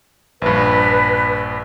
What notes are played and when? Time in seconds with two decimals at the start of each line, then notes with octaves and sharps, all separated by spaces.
0.42 A#1 G2 B4